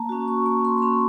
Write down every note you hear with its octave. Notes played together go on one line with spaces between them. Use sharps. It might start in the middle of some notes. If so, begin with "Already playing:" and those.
Already playing: A#3 A5 A#5
C#4 F#4
C#6
A#3 C#6
C6
C6
C#4 F#4 B5